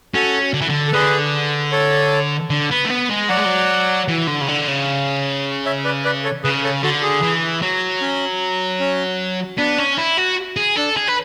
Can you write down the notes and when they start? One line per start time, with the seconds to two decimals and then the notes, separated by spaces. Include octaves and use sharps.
0.14 C#4 F#4 A4
0.54 D3
0.61 E3
0.69 D3
0.88 A4
0.93 D3 G#4 B4
1.72 A4 C#5
2.50 D3
2.71 B3
2.85 A3
2.90 B3
3.09 G#3
3.29 F#3 D5 F#5
3.37 G#3
3.45 F#3
4.08 E3
4.27 D3
4.41 C#3
4.48 D3
4.68 C#3
5.66 C#5 E5
5.85 B4 D5
6.05 B4 D5
6.24 A4 C#5
6.44 C#3 G#4 B4
6.63 A4 C#5
6.83 D3 F#4 A4
7.03 G#4
7.23 E3
7.62 F#3
8.01 C#4
8.79 C#4
9.58 B3 D4
9.78 C#4
9.98 E4
10.17 F#4
10.57 G#4
10.76 D4 A4
10.97 G#4
11.08 B4